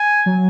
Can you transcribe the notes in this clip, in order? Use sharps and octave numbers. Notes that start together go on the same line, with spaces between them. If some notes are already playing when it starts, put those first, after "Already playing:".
Already playing: G#5
F#3